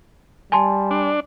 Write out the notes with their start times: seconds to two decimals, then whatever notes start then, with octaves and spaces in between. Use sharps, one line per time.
0.52 G3 G#5 A5 C6
0.91 D4